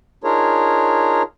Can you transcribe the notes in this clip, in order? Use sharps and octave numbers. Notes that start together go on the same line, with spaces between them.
D4 D#4 F4 G#4 A#4 C#5